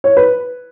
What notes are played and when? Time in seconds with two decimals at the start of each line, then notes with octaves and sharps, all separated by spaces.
0.04 C#5
0.17 B4